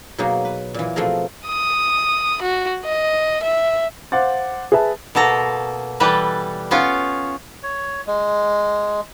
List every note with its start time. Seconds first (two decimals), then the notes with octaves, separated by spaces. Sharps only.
0.18 B2 F#3 A#3 D#4 G#4 A#4
0.45 B4
0.74 A#2 E3
0.96 B2 F3 A3 C4 G#4 A#4
1.47 D#6
2.42 F#4
2.85 D#5
3.43 E5
4.12 C5 F5 F#5 D6 A6
4.72 G#4 B4 E5 A5
5.15 B2 A#3 A4 A#5
6.00 E3 G3 A4 B4
6.71 B3 C#4 F4 F5
7.63 C#5
8.07 G#3